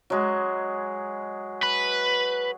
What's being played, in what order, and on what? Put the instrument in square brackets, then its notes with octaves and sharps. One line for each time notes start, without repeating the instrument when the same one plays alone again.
[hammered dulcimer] F#3 G#3
[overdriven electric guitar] B4